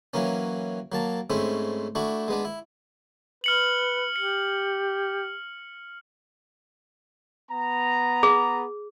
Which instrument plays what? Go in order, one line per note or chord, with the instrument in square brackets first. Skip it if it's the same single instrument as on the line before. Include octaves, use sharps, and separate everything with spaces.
[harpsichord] E3 F#3 A#3 C#4
F#3 A#3 A5
G#2 A3 C4 C#4 E4
A3 D4 E4 F#4
G#3 B3 D4
E4
[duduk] B4 [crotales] F6 C#7 F#7
[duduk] G4 [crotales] C#7
[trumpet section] B3 A#5
[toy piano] G#4